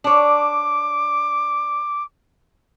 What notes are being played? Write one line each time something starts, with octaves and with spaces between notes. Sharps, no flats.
D4 C#5 D6